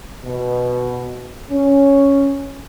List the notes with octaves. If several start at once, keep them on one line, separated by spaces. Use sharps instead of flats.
B2
C#4